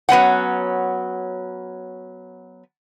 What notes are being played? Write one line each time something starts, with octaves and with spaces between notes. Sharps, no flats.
F#3 B3 C#4 F#5